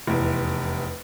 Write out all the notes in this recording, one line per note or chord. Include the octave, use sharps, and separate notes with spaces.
F1 E2